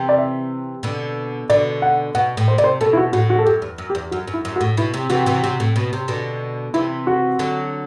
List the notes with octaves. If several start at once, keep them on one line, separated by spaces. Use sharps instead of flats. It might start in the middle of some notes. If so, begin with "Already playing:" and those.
Already playing: C3 E3
D5
E5
B2 D3
B2 D3 D5
F#5
B2 F#5
A2
C5
C3 D5
C5
B2 A4
E4
F#4
A2 F#4
F#4
A4
F#2 G4
E2
F#2
G4
E2
F#2 F#4
F#2
E4
F#2
F#4
A2
B2 E4
C3
C3 E3 F#4
C3 E3
C3
A2
B2
C3
B2 D3
C3 E3 E4
F#4
D3 F#3